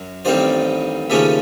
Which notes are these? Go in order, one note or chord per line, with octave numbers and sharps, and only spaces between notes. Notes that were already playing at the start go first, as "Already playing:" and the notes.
Already playing: F#2 F#3
A1 G2 D#3 G3 C4 C5 D5
D#2 C#3 F3 A3 C#4 D5 E5